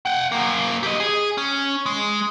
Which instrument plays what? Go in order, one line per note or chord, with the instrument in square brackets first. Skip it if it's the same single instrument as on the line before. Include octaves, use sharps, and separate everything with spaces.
[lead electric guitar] F#5 G5
F#2 A#3
G4 D#5
G#4
C#4
G#3